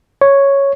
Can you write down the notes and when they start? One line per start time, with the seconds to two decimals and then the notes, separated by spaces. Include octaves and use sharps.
0.21 C#5